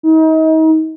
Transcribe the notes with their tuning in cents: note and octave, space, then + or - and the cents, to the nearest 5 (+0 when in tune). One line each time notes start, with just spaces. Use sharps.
D#4 +35